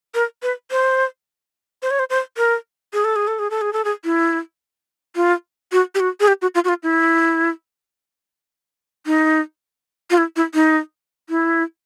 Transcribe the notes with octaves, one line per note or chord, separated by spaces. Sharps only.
A#4
B4
C5
C5
C#5
C5
C5
A#4
G#4
A4
G#4
A4
G#4
A4
G#4
A4
G#4
E4
F4
F#4
G4
F#4
G#4
G4
F#4
F4
F#4
F4
E4
D#4
F4
E4
E4
D#4
E4